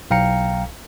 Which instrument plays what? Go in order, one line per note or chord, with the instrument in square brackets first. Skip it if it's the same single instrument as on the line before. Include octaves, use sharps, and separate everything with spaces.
[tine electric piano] B1 F5 G5 A#5 C#7